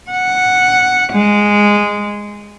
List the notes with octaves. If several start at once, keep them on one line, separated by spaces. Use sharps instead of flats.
F#5
G#3